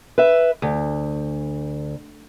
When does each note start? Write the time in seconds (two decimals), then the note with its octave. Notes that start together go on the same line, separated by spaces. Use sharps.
0.18 B4 E5
0.62 D2